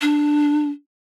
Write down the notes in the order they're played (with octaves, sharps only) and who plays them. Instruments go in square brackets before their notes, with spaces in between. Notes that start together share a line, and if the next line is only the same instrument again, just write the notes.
[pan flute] D4